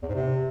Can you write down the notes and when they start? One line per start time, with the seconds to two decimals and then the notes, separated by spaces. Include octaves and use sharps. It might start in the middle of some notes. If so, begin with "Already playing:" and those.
0.02 E2
0.09 G#2
0.15 C3